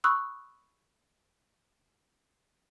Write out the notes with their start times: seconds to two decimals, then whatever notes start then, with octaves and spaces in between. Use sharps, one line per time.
0.04 B5 C#6 D#6 E6 F#6